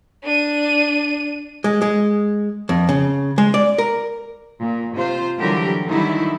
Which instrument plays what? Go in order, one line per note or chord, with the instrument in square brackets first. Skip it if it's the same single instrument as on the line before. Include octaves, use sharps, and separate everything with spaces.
[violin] D4 D#7
[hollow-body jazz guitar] G#3
G#3
F2
C#3
G#3
D5
A#4
[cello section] A#2
C3 F4 C5
D3 E3 F#3 G3 G4 A#4
D3 D#3 F#3 G3 D#4 E4